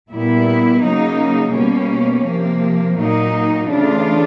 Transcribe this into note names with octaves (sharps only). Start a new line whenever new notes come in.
A#2 G3 B3 E4
C#3 F#3 A#3 D#4
B2 G3 A#3 C#4
C3 F3 A#3
A#2 F#3 A#3 D#4
C#3 E3 A3 D4 F4